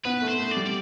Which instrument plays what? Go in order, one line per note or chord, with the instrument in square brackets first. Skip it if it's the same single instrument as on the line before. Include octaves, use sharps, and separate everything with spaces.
[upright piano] B3 [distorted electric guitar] B4
[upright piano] A3
[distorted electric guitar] C5
[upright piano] A3
[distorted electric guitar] D5
[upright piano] G3
[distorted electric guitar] D5